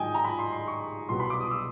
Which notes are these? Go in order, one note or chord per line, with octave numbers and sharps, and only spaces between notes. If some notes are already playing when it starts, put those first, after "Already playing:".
Already playing: G#2 D#3 F#3 D#5 G5 G#5
A#5
B5
C6
C6
C#6
C2 B2 F#3 C6
B5
D6
D#6
E6